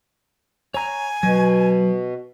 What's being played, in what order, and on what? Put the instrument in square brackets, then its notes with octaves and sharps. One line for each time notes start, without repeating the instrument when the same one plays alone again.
[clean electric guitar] C#5 A#5 [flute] G#5
[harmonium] B2 [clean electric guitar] F#3